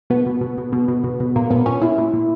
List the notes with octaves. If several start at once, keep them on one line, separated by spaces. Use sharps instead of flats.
B2 B3
B2
B2
B2
B2
B2
B2
B2
A#2 A#3
A#2 B3
A#2 C#4
A#2 E4
A#2
A#2